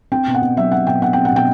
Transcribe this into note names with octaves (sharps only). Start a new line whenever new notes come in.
C4 G5
B2
F#5
B2
F#3 E5
C4 F#5
B2 G5
B2 F#5
C4 G5
F#5
B2 G5